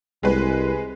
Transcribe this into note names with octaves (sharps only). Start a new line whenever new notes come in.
C2 G#3 B4